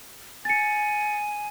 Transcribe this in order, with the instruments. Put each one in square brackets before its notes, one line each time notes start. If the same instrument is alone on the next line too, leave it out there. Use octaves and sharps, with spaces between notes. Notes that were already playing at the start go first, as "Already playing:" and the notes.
[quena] G#5 [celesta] A6 C#7